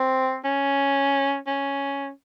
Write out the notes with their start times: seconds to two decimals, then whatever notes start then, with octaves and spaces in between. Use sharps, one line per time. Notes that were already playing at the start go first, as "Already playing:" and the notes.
Already playing: C4
0.44 C#4
1.47 C#4